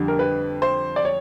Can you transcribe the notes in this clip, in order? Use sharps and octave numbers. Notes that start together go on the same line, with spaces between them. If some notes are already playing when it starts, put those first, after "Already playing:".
Already playing: F2 D3 G3
A#4
B4
C5
D5
C#5